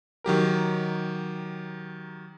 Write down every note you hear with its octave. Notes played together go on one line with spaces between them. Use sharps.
D#3 F#3 G4 A#4